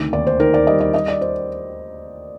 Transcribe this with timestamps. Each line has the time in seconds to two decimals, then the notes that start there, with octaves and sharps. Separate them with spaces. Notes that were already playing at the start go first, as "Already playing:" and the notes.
Already playing: D2 C3 D#3
0.13 D#2 D5
0.27 C5
0.40 D#3 A#4
0.54 D5
0.67 G3 D#5
0.81 D5
0.94 G3 D#5
1.08 D5
1.21 C5